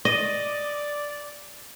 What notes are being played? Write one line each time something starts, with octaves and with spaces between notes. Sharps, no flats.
D5 D#5